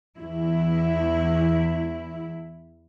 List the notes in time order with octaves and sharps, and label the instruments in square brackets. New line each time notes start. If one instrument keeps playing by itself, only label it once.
[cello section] E2 E4